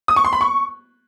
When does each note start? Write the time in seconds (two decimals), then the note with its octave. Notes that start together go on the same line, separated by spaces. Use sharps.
0.08 D#6
0.16 C#6
0.25 C6
0.33 B5
0.41 C#6